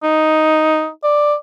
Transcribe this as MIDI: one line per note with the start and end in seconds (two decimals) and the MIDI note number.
0.03 0.88 63
1.04 1.34 74